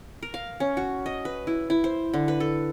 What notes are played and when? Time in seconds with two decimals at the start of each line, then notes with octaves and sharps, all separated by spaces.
0.23 A#4
0.34 F5
0.60 C#4
0.77 F#4
1.06 D#5
1.25 B4
1.47 E4
1.70 E4
1.84 C5
2.14 D3
2.28 B4
2.40 A4